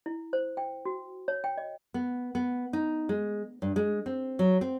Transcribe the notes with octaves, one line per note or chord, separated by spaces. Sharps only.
E4
C5
G5
F#4
C#5
G5
D#5
B3
B3
D#4
G#3
G2
G#3
C4
F#3
C4